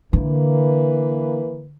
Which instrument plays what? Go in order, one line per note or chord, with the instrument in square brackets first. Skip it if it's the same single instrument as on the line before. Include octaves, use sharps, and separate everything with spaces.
[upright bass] D3 [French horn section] E3 A#3 B4